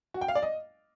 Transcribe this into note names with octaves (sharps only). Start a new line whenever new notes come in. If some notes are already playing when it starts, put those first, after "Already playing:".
F#4
G5
F5
D5
D#5